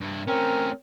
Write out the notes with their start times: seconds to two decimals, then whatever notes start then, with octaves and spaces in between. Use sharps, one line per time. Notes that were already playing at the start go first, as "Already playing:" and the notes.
0.01 G2 E4
0.28 A3 C4 C#4 A#4